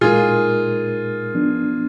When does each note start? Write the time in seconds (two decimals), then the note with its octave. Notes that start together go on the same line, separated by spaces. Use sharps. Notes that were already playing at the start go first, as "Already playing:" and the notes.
0.01 A#2 G#3 D#4 F4 G#4 A#4
1.35 F3 B3 D4